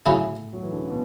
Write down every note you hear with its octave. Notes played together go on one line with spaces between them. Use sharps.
A2 C#3 F#3 C#4 E4
F#3
E3
D3
C#3
B2